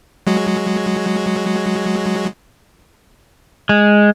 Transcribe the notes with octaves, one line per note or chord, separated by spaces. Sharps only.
F#3 G#3 F#4
G#3